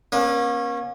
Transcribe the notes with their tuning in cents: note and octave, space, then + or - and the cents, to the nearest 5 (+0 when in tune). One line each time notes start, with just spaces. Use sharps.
A#3 +40 C#4 -20